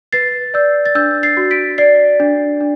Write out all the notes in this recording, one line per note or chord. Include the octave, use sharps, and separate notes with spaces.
B4 A6 C7
D5 E6 G6
A6
D4 E6 G6
A6 C7
F#4
B6 D7
D5 A6 C7
D4
D4